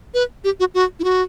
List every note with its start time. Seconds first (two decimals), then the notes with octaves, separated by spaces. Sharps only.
0.14 B4
0.44 G4
0.60 F#4
0.74 F#4
0.99 E4
1.04 F#4